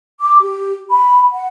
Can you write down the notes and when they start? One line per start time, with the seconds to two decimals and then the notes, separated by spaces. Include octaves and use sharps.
0.21 D6
0.41 G4
0.90 B5
1.31 F#5